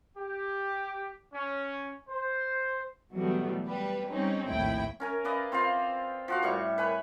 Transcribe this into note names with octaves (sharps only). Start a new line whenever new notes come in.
G4
C#4
C5
B2 E3 F#3 G3 A3 B3
G3 B4
G3 C4 C#4 D#4
A#1 D#2 A2 E4 G5
C#4 A#4 G#5
B4 D5 D#5 F5
C4 F4 C5 F5
F3 F#4 F5
A2 G3 E5 C#6
B4 C#5 G#5 B5